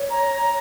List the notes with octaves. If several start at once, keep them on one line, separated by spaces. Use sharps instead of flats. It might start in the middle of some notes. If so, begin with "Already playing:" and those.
Already playing: C#5
A#5